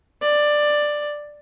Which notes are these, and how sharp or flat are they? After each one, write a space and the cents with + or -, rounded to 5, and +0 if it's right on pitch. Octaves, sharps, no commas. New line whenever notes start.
D5 +10